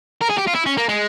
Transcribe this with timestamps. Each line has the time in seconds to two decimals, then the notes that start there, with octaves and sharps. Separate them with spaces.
0.22 A#4
0.30 G#4
0.38 G4
0.47 F4
0.55 E4
0.66 C#4
0.77 A#3
0.89 G#3